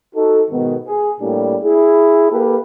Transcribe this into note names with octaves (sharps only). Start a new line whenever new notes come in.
D#4 F#4 A4
G#2 B2 D#3 B3
G#4
A2 G3 A#3 D4 G4
E4 G#4
A#3 G4 A4 B4